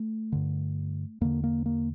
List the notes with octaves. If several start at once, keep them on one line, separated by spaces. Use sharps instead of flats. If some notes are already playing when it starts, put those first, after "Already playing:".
Already playing: A3
G2 D3
E2 D3 A#3
A#3
A#3